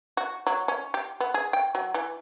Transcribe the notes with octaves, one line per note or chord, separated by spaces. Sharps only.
F#4
F#3
C#4
G4
B3
G#4
G5
F#3
E3